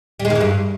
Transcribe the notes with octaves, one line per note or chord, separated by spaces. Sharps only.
G3
G#3
D#3
E3
G2